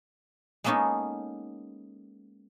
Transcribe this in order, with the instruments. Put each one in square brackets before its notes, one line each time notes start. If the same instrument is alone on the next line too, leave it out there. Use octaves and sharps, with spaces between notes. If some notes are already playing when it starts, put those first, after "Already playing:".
[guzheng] G#3 A#3 B3 C#4 D#4 A4